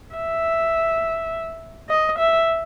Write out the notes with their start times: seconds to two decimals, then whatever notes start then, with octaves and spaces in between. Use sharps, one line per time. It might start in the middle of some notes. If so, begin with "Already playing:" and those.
0.15 E5
1.89 D#5
2.19 E5